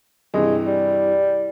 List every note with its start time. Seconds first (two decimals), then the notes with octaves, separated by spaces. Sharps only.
0.34 G2 C3 E3 G#3
0.67 G3